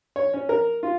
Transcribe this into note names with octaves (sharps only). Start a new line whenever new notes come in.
C#5
C#4
A#4
F4